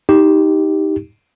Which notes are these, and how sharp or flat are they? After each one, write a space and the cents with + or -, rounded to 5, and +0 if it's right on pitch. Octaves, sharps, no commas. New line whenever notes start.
D#4 +15 G4 +0